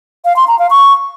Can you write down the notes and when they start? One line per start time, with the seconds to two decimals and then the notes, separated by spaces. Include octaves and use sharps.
0.25 F5
0.36 C6
0.48 A#5
0.59 F5
0.70 C#6